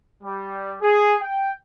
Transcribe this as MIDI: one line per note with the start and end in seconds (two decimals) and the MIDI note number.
0.23 0.75 55
0.81 1.15 68
1.21 1.51 79